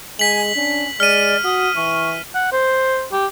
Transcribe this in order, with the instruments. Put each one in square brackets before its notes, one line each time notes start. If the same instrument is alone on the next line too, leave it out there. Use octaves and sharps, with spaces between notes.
[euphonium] G#3 [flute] G#5 [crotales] B6 F#7
[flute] C#4 [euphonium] D4
[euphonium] G#3 [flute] D5 [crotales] F6 D#7
[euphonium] F#4 [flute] D#6
[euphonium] E3 [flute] C#6
[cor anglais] F#5
C5
G4